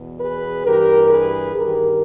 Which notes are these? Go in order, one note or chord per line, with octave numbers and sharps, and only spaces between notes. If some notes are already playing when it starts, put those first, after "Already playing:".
Already playing: E2 B2
G#4 B4
G2 E3 G4 A#4
G#4 B4
G2 D#3 G4 A#4